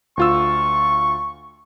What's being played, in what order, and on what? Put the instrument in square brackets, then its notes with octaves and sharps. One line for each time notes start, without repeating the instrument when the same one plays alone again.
[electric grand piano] D2 F4 E6 [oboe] C#6